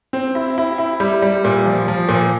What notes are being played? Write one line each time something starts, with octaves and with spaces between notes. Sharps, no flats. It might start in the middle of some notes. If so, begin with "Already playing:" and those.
C4
E4
E4
E4
G3
G3
A#2
F3
F3
A#2